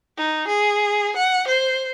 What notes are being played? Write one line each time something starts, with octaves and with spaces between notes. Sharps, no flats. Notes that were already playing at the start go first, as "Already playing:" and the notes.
D#4
G#4
F#5
C5